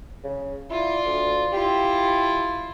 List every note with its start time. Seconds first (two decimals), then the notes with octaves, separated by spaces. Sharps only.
0.24 C#3
0.70 E4 F4 D5
1.06 D2
1.53 E4 F4 G4